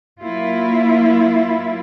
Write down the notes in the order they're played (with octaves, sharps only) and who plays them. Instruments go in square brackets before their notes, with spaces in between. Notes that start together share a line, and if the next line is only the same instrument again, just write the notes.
[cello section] F#3 A#3 E4 F4